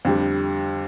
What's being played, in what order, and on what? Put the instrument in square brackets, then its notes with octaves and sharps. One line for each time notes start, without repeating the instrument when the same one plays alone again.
[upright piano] F2 D3 G3